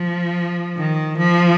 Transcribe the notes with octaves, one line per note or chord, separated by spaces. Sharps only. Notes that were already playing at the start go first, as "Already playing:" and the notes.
Already playing: F3
D#3
F3